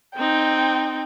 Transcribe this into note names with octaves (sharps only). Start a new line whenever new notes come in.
C4 D#4 G5